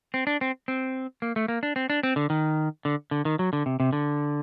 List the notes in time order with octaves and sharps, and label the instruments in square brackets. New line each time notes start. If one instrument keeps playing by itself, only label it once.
[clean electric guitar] C4
D4
C4
C4
A#3
A3
A#3
D4
C4
D4
C4
D3
D#3
D3
D3
D#3
F#3
D3
C3
C3
D3